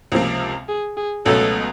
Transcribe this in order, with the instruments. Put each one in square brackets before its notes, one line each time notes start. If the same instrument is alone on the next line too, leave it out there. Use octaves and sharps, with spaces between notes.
[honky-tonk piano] C#2 C3 F3 A#3
[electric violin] G#4
G#4
[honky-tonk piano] C#2 B2 F#3 A3 C#4 [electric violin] A4